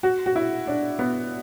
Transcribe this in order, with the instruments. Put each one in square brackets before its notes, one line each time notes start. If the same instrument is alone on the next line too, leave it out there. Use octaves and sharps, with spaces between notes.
[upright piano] F#4
F#4
E4
D4
B3